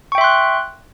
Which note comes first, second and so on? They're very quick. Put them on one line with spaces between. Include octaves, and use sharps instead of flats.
C#6 G5 E5 C6 F#6